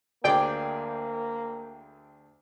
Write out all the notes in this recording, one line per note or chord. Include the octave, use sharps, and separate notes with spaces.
D2 D3 A#3 G#4 D5 G5 D6